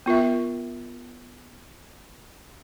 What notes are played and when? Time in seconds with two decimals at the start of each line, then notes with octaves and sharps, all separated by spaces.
0.06 B3 F4 A#4 E5